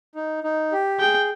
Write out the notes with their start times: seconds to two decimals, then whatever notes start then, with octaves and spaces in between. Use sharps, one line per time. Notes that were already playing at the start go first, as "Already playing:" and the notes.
0.15 D#4
0.44 D#4
0.72 G4
1.00 G#4 G5